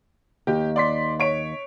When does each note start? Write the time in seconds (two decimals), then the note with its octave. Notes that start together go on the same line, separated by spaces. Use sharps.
0.47 D#2 G4
0.76 D5 C6 B6
1.20 C#5 D7